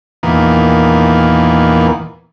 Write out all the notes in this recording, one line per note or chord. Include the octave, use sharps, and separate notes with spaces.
E2 A#2 D#3 E3 A#3 B3